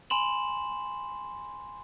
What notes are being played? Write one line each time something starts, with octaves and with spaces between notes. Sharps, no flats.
G#5 B5 C6 E7 F#7